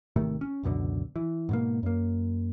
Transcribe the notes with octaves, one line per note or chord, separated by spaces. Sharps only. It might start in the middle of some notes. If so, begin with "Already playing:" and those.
G#1 C3 D#3 A3
C#4
C#2 F#2 B2 D3
E3
G#2 B2 A#3
F#2 A#3